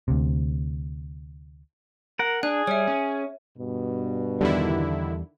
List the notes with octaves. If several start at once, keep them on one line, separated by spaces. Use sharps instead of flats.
D2 C3
A#4 F#5
D4 G#4 F#6
G3 C#5 E5
C#4
G2 B2
E2 D3 D#3 G3 E4